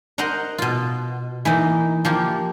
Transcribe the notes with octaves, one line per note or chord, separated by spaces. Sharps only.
A#4 C5 D#5 F#5 A#5
B2 F4
E3 A#3 D#4
F3 A#3 G4